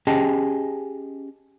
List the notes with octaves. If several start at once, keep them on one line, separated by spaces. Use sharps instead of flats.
C#4 G4 G#4 D#5 G5 A5